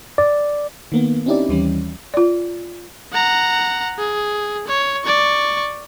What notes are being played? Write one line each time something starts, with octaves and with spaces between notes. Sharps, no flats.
D5
D#3 A#3 B3
C4 C#4 D#4 E4 G4 D5
D#2 E3 G3 C#4
F4 D5
F#5 A#5
G#4
C#5
D5 C#6